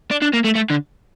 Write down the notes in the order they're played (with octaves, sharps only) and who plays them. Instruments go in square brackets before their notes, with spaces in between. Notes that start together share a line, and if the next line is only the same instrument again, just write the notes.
[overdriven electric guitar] D4
D4
A#3
A3
A3
D3